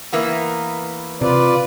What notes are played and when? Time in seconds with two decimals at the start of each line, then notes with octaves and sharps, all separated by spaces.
0.13 E3 A#3 B3
1.21 C3 F4 B4 D5